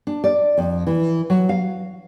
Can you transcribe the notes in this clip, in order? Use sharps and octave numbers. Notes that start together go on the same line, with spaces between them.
D4
D5
F2
E3
F#3
F5